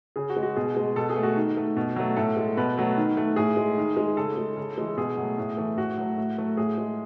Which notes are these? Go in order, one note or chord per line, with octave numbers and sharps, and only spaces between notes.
C#3 G#4
F#4
G#3
F#4
B2 G#4
G#3
B2 A4
G#4
A3
F#4
D#3
A3
B2
F#3 A3
A2 A4
G#3
B2 B4
F#3 A3
D#3
A3
A2 G#4
G#3
D#3
G#3
C#3 A4
G#3
C#3
E3 G#3
B2 G#4
F#3 A3
A2
E3 A3
A2 F#4
F#3 A3
A2
F#3 A3
A2 G#4
G#3